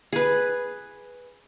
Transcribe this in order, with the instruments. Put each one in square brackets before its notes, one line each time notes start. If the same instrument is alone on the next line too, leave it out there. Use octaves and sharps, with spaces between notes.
[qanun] G#4 B4